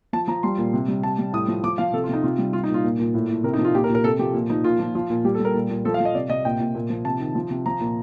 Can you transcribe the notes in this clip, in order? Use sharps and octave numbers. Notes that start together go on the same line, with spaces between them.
F3 A5
F3 A#5
G3 C6
A#2
C3
G3
G3 A5
G3
A2 D#6
F3
F3 D6
F3 F5
C3 A4
F4
C3 D#4
C3 F4
G3
G3 F4
D#4
A#2
F4
A#2
A#2
A2
A2
C3 A#4
D#4
F3
F4
A#2 G4
A#4
A#2
A#4
C3 A4
F3 G4
A#2
F3 D#4
A#2 F4
F3
F3 F4
A#2
G3 G4
A4
G3
A#4
A#2
A#2
F3 A4
F5
F3
D#5
C3 D5
C3 D#5
A#2 G5
A#2
A#2
F3
C3 A5
D#3
F3
C3
F3 A#5
A#2